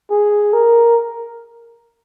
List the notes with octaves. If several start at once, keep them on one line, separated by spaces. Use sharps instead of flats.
G#4
A#4